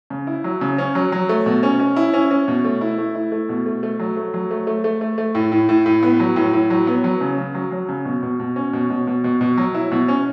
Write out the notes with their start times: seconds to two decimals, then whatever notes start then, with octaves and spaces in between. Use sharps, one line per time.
0.10 C#3
0.27 E4
0.44 F#3
0.61 C#3
0.78 C#4
0.95 F#3
1.12 F#3
1.29 A3
1.46 B2
1.63 C#4
1.79 C#4
1.96 E4
2.14 C#4
2.31 C#4
2.48 B2
2.65 A3
2.81 E4
2.98 A3
3.15 E4
3.32 A3
3.49 B2
3.66 A3
3.83 A3
3.99 F#3
4.17 A3
4.34 F#3
4.51 A3
4.67 A3
4.84 A3
5.01 A3
5.18 A3
5.35 A2
5.52 A2
5.69 A2
5.86 A2
6.03 B3
6.20 F#3
6.36 A2
6.53 A2
6.70 F#3
6.87 B3
7.04 F#3
7.21 C#3
7.38 C#3
7.55 F#3
7.72 F#3
7.89 C#3
8.05 B2
8.23 B2
8.39 B2
8.56 C#4
8.73 B2
8.90 B2
9.07 B2
9.24 B2
9.41 B2
9.58 F#3
9.75 E4
9.91 B2
10.08 C#4